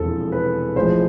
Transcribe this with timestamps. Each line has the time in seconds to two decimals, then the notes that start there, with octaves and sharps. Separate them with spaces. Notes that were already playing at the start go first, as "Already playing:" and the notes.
Already playing: E1 E2 C3 F3 A4
0.32 B4
0.75 A1 A2 F3 G#3 C5